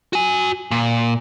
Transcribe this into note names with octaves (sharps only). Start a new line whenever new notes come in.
F#4 G#5
A#2